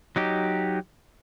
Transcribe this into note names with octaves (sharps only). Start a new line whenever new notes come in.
F#3 D#4 G4